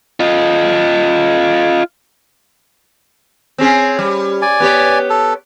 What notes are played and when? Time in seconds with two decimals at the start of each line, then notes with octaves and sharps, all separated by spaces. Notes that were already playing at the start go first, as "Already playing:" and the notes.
0.20 F4 D#5
3.58 C4 C#4 G#4
3.99 G3
4.42 D5 G#5
4.60 B3 G4 C#5
5.10 A4